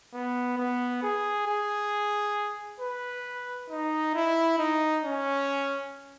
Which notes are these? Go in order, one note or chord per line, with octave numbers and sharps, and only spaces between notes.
B3
B3
G#4
G#4
B4
D#4
E4
D#4
C#4